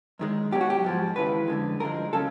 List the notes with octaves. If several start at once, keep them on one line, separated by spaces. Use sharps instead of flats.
F#2 D#3 G#3
B1 B2 F#3 G4
F#4
G4
G#2 F3 G#3
D#2 C#3 E3 G#3 B4
F2 D3 F3 G#3
G2 D3 F3 G#3 A#4
C#3 F#3 A4